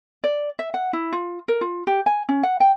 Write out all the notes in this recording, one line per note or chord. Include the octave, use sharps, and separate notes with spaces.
D5
E5
F#5
E4
F4
A#4
F4
G4
G#5
C#4
F#5
G5